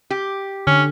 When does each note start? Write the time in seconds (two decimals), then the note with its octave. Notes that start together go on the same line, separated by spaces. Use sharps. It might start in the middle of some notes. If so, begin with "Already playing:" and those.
0.10 G4
0.67 D3 C#4